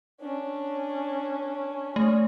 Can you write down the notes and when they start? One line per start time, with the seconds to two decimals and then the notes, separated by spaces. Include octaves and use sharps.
0.21 C#4 D4
1.96 A3 G#4 C#5